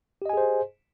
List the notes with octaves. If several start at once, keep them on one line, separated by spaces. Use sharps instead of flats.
G4 G#4 C5 D#5 G#5